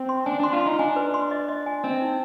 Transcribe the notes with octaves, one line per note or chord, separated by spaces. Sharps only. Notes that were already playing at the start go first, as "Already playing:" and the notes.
Already playing: C4
C6
D4 G#5
D4 C6
F4
D#4 C6
D4 G#5
B4
C6
D#5
D#5
G#5
C4 D#5
D#4